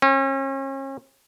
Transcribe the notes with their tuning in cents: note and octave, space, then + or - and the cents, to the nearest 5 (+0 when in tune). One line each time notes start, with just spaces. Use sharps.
C#4 -40